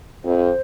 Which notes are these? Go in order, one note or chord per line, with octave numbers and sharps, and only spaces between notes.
F2 C5